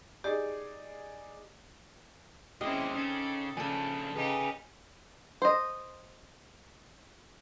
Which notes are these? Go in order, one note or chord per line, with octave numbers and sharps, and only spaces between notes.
D#4 G4 G#4 D5
D#2 G#3 C4 C#4 E4 G4 D#5
C#3 D#4 A4
C#3 F3 D4 A4 G#5
C#3 D#4 G4 G#4 B4
C5 D#5